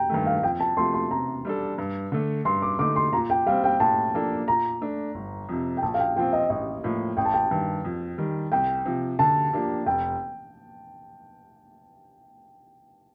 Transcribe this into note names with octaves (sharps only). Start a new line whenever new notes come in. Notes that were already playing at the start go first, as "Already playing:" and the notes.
Already playing: G5 A#5
G2 D#3 A3
F5
F2 G5
A5
C3 F3 A3 C6
C6
C3 A#5
G3 D4 A4
G2
D3 A3
G2 C6
D6
D3 A3 D#4 D6
C6
A#2 A#5
G5
G3 C4 F5
G5
A2 A5
F3 A#3 D4 A4
A#2 A#5
A3 D4
G1
F2 C3
G5
A#1 A5
F5
G5
A#2 F3 C4 F4 G5
D#5
A1 D#5
A2 F3 A#3
A1 G5
A5
G5
G2 D#3
F2
D#3 G3
C2 G5
C3 F3
D3 A5
F3 A#3 D4 G4
F1 G5